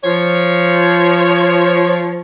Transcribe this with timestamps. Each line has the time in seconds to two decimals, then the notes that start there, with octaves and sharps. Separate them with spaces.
0.04 F3 C#5